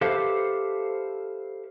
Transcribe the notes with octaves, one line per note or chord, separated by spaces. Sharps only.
G4 A4 B4 C5 E5 F5